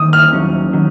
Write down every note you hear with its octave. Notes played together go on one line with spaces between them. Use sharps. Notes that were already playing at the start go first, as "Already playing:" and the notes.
Already playing: D#3 D#6
F6
D#2 D#3 F#3 C#4
D#3 F#3 C#4